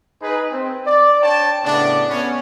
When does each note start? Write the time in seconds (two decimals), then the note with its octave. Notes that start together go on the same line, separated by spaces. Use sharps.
0.22 D#4 G#4 B4
0.52 C4
0.86 D5
1.22 D4 C#5 G5 A5
1.64 A2 C#3 B3 D4
2.09 B3 C#4